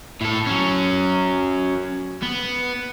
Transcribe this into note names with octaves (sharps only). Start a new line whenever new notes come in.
A2 A4
F#3 C#4
B3